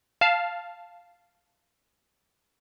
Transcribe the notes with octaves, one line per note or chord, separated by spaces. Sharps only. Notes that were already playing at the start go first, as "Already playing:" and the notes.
F5 A5 F6